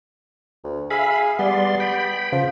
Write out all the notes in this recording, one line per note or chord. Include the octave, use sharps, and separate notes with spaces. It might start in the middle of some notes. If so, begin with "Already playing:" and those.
D2
G#4 E5 F5 B5
G3 B3 D5 C6
G5 B5
C#3 F3